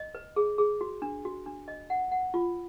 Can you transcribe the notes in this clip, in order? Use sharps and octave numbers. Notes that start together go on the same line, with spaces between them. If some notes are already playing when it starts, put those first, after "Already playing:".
Already playing: D#5
B4
G#4
G#4
F#4
D4
F#4
D4
D#5
F#5
F#5
F4